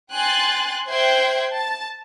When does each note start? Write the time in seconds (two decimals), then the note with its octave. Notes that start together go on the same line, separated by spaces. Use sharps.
0.12 G5 G#5 C6 F#6 A6
0.90 C5 E5 G5 C6 F#6 G#6
1.54 A5 A6